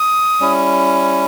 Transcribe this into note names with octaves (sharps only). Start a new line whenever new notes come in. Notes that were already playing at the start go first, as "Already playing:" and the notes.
Already playing: D#6
G3 C#4 E4